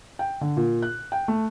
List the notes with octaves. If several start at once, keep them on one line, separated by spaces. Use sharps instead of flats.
G5
D3
A#2
F#6
G5
A3